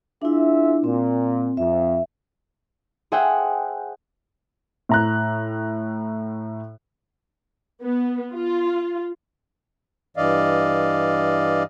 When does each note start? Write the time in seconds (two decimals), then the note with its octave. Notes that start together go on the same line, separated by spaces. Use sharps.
0.22 D4 E4 F4 G#4 E5
0.84 A#2 C4
1.57 F2 E5
3.12 G#4 C5 E5 F#5 G5
4.89 A2 A#5 F#6
7.81 B3
8.32 F4
10.17 G2 E3 D5 D#5 F5